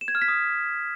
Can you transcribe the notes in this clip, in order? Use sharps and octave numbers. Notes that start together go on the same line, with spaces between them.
E7
G#6
F6
B6
D#6